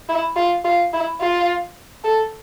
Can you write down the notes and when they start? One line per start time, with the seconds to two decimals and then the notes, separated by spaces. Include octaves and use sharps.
0.09 E4
0.36 F4
0.64 F4
0.93 E4
1.20 F4
2.04 A4